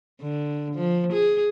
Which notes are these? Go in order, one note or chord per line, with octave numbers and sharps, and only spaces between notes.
D3
F3
G#4